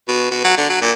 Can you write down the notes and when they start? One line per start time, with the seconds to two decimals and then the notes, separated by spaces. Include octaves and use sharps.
0.08 B2
0.31 B2
0.44 F#3
0.57 D3
0.69 F#3
0.81 A#2